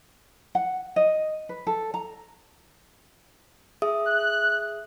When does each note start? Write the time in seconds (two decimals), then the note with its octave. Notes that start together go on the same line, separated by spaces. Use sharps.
0.55 F#5
0.96 D#5
1.49 B4
1.67 A4
1.94 A#5
3.82 G#4 E5 D#6
4.05 F#6